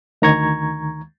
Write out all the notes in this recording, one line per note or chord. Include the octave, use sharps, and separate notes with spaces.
D2 D#3 A#5 C#6 G#6